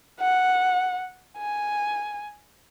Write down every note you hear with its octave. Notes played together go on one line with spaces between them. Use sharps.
F#5
G#5